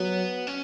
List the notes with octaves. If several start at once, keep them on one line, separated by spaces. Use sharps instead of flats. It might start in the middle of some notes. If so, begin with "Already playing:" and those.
Already playing: F#3 B3
C#4